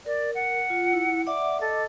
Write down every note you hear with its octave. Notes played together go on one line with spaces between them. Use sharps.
A#4 D5
F#5
F4
E4
D5 E5 F#5 D6
A4 D#5 D6